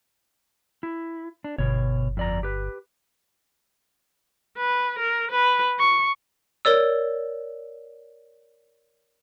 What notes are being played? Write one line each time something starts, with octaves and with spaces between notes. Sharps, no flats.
E4
D4
G1 B2 C#5
F2 D5 A#5
G4 B4
B4
A#4
B4
C#6
A#4 C#5 D5 E6